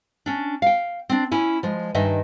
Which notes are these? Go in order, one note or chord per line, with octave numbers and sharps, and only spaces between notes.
C#4 D4
F5 G5
C4 D4
C#4 E4 G#5
F3 G#3
G2 D#3 D#5 E5 G#5